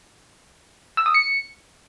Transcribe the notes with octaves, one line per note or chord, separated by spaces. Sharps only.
E6
D#6
C#7